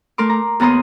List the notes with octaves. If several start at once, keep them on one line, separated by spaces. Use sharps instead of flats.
A3 A#4 C6 D6
A#5
D#2 B3 A#5 C6 D#6